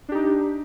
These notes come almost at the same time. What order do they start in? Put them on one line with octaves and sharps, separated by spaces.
D4 G4 D#4